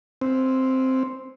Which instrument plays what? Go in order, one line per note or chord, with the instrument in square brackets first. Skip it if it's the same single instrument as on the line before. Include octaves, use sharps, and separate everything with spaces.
[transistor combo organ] C4